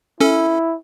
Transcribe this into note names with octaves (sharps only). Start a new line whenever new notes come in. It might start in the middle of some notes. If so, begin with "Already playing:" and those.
C#4 E4 A4